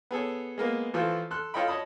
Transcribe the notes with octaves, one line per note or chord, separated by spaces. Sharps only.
B3 G#4 A4 C#5
G#3 A#3 B3
E3 F3 A3 F4 A4 C5
A4 C6 F#6
F4 A4 C#5 D#5 G5 B5
C#5 D#5 A5 B5 D#6